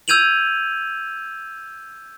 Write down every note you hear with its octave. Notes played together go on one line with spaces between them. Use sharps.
E6 G6 G#6 D#7 F7 F#7